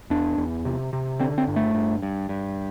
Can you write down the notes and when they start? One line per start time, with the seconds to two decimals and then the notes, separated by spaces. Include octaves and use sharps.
0.10 E2 D4
0.38 E2
0.65 C3
0.93 C3
1.20 D3 C4
1.38 C4
1.47 G2
1.56 A3
1.74 G2
2.02 G2
2.29 G2